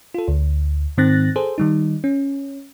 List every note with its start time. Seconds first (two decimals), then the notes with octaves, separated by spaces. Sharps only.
0.14 F4 A4
0.28 D2
0.97 G#2 D#3 C4 F#6 A6 A#6
1.36 G#4 A4 C5
1.58 D#3 G3 D#4
2.04 C#4